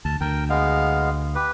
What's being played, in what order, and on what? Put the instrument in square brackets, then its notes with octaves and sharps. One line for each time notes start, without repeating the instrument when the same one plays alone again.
[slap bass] D2 [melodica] A5
[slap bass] D2 [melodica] A#4 G5
[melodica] G#3 B3 F5
G4 B4